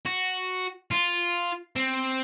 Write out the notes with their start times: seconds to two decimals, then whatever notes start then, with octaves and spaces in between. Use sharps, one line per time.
0.06 F#4
0.91 F4
1.76 C4